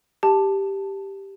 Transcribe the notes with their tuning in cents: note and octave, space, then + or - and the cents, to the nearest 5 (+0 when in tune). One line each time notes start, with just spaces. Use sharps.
G4 +0 A5 +0